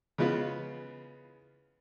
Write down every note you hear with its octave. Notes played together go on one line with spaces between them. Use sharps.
C#3 E3 G#3 B3 F4 B4